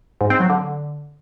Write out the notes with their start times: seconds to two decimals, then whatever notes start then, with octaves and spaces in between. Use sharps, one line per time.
0.21 G#2
0.30 C4
0.40 F#3
0.50 D3